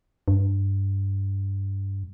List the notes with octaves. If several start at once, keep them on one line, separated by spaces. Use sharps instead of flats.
G2